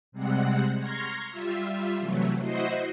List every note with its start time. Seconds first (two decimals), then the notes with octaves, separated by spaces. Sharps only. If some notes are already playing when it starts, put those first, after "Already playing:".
0.12 C3 G3 G#3 C4 F#5
0.77 A#5 C6 C#6 F6 G#6 A#6
1.30 G3 F4 E5
1.98 C3 E3 F#3 A3
2.40 E4 F#4 C5 D#5 C7